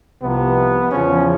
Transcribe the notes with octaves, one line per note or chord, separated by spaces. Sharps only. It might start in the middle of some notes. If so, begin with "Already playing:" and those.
C2 C3 F3 B3
E2 C#3 F3 C#4